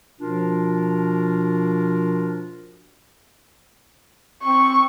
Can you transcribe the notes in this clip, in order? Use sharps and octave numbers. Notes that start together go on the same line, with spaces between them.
B2 F3 D4 F4 A#4
C4 C#6